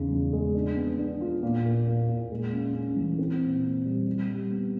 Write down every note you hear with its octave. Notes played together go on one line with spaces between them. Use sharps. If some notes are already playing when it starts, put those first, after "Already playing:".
Already playing: E2 C#3 D#4
F3
G#3
D4
B3
D4
F4
A#2
A#3
A#2
A#2
G#3
C#4
C#4
E3
C4
A#2
A#2
G3
G3
G3
B3